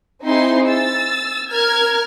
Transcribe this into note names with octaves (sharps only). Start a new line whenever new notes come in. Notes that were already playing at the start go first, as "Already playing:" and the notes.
C4 D#4 E4 G#4 C6
E6 A6
A#4 F6 G#6